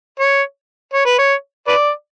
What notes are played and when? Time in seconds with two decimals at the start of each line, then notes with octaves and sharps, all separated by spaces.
0.20 C#5
0.94 C#5
1.06 B4
1.18 C#5
1.68 B4 D5